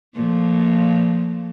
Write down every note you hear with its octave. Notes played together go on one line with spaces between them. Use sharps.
A#2 F3 A3